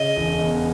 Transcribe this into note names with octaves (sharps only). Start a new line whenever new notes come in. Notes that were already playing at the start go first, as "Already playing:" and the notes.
Already playing: C#3 D#5
E1
E2